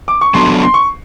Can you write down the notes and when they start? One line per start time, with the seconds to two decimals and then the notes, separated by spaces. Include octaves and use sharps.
0.08 D6
0.21 C#6
0.34 F#3 B3 D4 F#4 A4 C6
0.63 C6
0.74 C#6